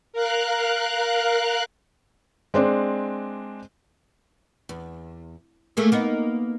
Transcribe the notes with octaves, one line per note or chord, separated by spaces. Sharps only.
A#4 F5 F#6
G#3 C4 D4
E2
A3 A#3 G#4
A#3 B3 D#4